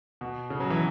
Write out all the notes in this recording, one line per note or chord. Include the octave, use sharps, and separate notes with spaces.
B2
C#3
F#3
E3